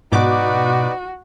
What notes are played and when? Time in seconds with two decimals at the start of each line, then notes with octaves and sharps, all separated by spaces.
0.12 G#2 B2 D#4 F#4 B4 D5 D6